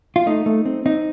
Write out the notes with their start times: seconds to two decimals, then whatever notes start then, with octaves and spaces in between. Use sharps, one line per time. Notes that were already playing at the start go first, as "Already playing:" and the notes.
0.16 F4
0.26 A3 D#4
0.46 A3
0.65 C4
0.86 C4 D#4